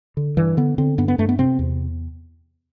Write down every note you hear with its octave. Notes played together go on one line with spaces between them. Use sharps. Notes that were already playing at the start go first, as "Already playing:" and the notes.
D3
G2 E3
D3 B3
D3 C4
G2 B3
B3
G2 A3
B3
C3 C4
E2